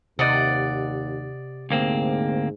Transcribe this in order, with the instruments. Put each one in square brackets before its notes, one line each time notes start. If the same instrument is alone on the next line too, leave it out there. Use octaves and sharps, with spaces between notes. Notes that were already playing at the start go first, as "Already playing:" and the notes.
[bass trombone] D#2 [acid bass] C3 [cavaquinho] D5 D#5 F#5
[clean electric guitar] D2 A#3 C4 [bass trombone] G#2